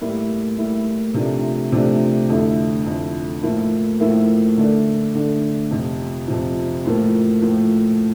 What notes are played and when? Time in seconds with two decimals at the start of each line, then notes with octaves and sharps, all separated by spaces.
0.01 A2 G3 A#3 E4
0.58 A2 G3 A#3 E4
1.14 C3 F3 A3 D4
1.72 C3 F3 A3 D4
2.29 F2 D3 A3 E4
2.86 F2 D3 A3 E4
3.43 A2 F3 A#3 E4
4.00 A2 F3 A#3 E4
4.57 D3 A3 D4
5.15 D3 A3 D4
5.71 F2 C3 F3
6.28 F2 C3 F3
6.85 A2 F3 A#3
7.42 A2 F3 A#3